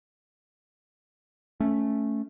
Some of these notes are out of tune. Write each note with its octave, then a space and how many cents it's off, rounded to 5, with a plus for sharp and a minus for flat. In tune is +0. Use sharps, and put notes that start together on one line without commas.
A3 +0 C#4 +0